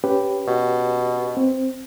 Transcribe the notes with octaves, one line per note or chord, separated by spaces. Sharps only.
C#4 G4 B4
B2
C4